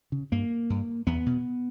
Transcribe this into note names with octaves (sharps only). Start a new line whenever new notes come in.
C#3
G2 A#3
G2
E2 B3
B2